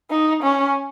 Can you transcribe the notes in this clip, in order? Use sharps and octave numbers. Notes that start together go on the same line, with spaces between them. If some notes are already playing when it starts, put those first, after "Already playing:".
D#4
C#4